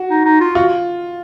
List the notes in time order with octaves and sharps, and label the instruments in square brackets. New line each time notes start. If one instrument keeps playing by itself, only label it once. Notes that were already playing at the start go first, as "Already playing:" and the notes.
Already playing: [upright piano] F#4
[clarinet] D#4
D#4
F4
[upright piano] F4 [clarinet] F#4